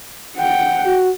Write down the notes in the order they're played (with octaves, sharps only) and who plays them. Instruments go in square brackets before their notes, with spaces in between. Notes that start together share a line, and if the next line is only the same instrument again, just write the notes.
[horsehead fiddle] F#5 G5
[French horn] F#4